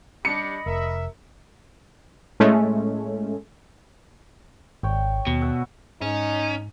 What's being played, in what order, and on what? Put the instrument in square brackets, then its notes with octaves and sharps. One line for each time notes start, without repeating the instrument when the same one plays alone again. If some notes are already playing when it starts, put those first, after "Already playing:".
[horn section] G3 D4 G4 [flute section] D#5 B5 D#6 [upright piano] C#7
[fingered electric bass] F1 [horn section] A#4 E5
[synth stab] A2 G#3 A3 C#4
[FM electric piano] G#1 [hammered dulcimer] C#5 G5
[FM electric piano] D#2 [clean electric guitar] B2
[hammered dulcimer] E5 F#5
[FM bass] G#2 [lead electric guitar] C#4 [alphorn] D#4